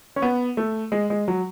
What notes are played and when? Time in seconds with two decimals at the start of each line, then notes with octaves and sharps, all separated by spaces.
0.16 C#4
0.22 B3
0.57 A3
0.92 G#3
1.10 G#3
1.28 F#3